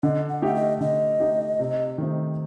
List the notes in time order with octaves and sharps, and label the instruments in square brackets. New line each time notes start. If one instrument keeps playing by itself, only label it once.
[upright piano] D3 [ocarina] D#5
[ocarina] F#5
[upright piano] A3 D#4 G4 [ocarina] F#5
[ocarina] D#5
[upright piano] D3 [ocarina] D#5
[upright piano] A3 D#4 G4
C3
D#3 A3 C4 D#4